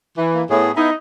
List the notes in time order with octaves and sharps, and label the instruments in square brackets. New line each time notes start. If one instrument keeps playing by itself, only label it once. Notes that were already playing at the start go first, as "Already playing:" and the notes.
[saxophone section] E3
[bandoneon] A#3
[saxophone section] A2 [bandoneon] B3 G#4
[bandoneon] B3 E4 E5 [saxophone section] D#4